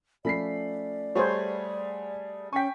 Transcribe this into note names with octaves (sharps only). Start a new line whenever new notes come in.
F3 A3 C#4 D5 B5 B6 C7
G3 A3 G#4 C5 C#5 F#5 B5 C6
C#4 G5 G#5 C#6 B6